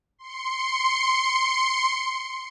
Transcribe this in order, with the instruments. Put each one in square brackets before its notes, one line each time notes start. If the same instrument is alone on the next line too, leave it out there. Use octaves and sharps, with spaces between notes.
[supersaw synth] C6 C#7